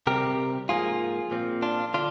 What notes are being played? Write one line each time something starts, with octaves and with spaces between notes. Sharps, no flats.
C3 G3 C4 G4 A#4
G#2 F3 A#3 F4 G#4
A#2 F3 C4
D4 F4
D3 D4 F4